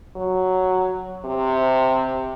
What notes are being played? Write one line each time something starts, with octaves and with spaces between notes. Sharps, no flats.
F#3
C3